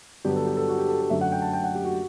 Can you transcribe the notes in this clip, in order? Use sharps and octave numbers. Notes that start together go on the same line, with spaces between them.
G2 D3 F#3 B3 G4
A4
G4
A4
F#4
G4
A4
A4
F#2 D3 A3 E5
F#5
G5
A5
G5
F#5
G4
F#4